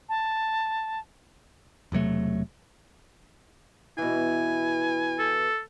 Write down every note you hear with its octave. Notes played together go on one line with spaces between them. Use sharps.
A5
E1 C3 F#3 A3
B2 E3 E4 G#5
A4